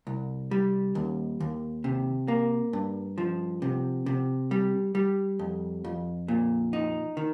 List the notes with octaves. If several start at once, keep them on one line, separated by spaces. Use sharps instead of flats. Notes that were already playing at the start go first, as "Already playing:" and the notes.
C2
G3
D#2
D#2
C3
A#3
G2
F3
C3
C3
G3
G3
F2
F2
A#2
D#4
D#3